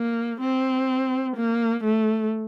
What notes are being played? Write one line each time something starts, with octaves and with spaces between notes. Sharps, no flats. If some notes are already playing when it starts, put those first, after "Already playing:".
Already playing: A#3
C4
A#3
A3